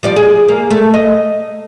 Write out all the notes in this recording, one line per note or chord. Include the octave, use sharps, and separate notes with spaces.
F3 G3 D5
G#4
A#3
A3
D#5